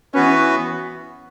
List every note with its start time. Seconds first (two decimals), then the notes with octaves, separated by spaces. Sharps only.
0.14 E3 B3 C#4 F#4 B4